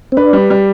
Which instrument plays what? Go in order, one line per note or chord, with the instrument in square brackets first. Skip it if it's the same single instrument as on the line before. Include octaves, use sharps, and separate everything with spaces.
[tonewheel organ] C4
[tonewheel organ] D4 [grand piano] B4
[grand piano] G3
G3